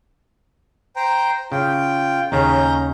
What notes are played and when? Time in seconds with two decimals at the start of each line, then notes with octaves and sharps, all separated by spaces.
0.96 C5 G5 A#5
1.52 C#3 F4 G5
2.32 D#2 C#3 C#4 A#5 G6